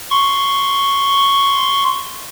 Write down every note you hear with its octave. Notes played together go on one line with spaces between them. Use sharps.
C6 C#6